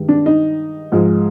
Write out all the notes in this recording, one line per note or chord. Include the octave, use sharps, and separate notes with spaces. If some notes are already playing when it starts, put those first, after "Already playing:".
Already playing: G2 D#3 G#3
D4
D#4
G#2 F3 G#3